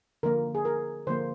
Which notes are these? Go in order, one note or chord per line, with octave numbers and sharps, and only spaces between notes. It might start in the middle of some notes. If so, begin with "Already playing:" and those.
D3 F3 A#3 A#4
G#4
A#4
D3 F3 A#3 C5